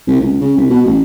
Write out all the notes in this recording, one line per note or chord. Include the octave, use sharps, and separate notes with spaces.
C2
C#2
C#3
C2
B2
A1